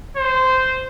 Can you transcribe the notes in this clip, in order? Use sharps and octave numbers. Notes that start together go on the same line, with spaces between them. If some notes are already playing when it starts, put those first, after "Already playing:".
C5